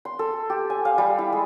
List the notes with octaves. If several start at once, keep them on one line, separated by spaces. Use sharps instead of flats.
C6
A4
G4
G#5
F5
G3
E4
G#3